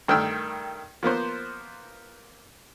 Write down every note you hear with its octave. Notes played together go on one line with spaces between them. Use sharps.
G2 D#3 A3 G5 E6 F6
F3 A#3 B3 C5